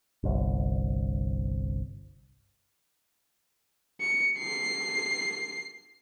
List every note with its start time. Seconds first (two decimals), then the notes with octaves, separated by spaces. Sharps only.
0.23 G1 C2
4.00 C#7
4.39 C7